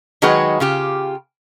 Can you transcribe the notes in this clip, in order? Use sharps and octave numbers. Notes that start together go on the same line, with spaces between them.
D#3 F#3 G#3 D#4 F#4 B4
C#3 F4 G4